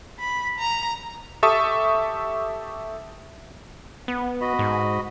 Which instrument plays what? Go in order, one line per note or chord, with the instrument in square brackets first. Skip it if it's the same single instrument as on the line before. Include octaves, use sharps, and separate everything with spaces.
[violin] B5
A#5
[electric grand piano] G4 A4 E5 A5 C#6 D#6
[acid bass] B3
[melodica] F#4 D#5 B5
[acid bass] G#2